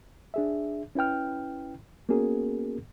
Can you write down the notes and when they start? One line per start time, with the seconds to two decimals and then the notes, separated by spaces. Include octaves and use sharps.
0.34 D4 G#4 E5
0.95 C#4 E4 B4 G5 F6
2.09 A#3 B3 C#4 F#4 G#4 A#4